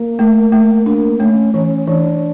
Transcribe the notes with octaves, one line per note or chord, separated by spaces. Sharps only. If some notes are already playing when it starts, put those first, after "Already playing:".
Already playing: A#3
A3
A3
A#3 D4
A3 C#4
E3 C#4
E3 D4